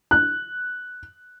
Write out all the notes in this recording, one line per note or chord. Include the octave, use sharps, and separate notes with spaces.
F#6